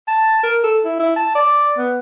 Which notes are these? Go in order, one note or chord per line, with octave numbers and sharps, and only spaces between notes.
A5
A#4
A4
E4
E4
A5
D5
B3